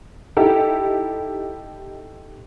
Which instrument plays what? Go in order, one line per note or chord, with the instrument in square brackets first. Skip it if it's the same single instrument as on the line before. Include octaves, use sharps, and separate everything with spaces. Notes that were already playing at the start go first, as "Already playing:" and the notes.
[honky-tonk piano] D#4 E4 G4 A4